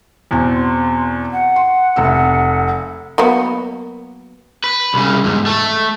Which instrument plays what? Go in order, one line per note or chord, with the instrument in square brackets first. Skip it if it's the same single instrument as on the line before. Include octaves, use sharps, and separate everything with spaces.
[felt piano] E2 B2 C4
[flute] C6
F#5
[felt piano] C6
F1 C3 E6
[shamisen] F#3 A#3 B3
[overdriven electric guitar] B4
C2 C#3
E2 G#2
A3 A4